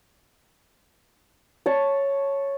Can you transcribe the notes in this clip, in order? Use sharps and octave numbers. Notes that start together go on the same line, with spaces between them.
C#5 A5 C#6